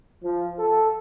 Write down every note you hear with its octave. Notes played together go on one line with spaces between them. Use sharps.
F3
A4